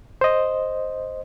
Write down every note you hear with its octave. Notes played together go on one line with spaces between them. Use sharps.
C5 D#5